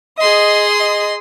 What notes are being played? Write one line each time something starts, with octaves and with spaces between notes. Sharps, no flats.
G#4 D#5 C6 D#6
D#5